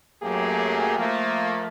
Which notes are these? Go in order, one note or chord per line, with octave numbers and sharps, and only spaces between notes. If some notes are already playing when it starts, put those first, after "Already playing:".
F#2 F#3 A3 A#3 G4 G#4
F3 A3 A#3